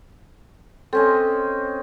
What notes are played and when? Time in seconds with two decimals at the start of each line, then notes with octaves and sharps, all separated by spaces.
0.93 C4 C#4 A4 D#5